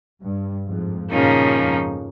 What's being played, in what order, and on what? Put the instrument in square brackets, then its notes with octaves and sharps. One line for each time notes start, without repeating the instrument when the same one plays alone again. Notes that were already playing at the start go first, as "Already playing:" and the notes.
[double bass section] G2
F2 G#2
[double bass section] G2 A#2 [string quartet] C#3 F3 A#3 D#4
[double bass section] F2 G#2